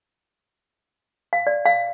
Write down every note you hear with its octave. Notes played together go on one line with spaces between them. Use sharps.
F5
D5
F5